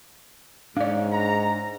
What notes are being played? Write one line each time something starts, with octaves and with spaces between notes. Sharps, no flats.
G#2 D4 C#5 D5 F5
A#5